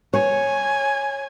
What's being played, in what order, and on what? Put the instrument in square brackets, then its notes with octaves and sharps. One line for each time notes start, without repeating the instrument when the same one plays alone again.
[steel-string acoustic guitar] C#5 [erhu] G#5